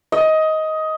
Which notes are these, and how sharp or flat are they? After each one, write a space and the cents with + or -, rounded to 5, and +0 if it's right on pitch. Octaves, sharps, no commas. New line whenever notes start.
D#5 +15